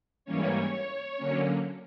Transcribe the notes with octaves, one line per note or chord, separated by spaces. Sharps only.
G#2 E3 G3 A#3 C#4 C#5
D3 F#3 A#3 C#4